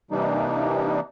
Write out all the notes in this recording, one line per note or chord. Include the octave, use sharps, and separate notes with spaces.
C3 E3 G3 A#3 D4 D#4